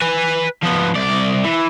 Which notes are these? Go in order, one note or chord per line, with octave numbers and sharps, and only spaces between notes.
B4 G#5
F3 B3
C2 D5
E3